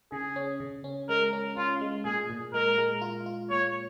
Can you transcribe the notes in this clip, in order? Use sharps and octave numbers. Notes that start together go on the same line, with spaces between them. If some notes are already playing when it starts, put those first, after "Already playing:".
C#3 G#4
C#4
C#3
C#4
G#3 A#4
C#4
C#4 F4
G#3
A#2 G#4
A#2
G#3 A#4
G#3
F4
F4
A#2 C#5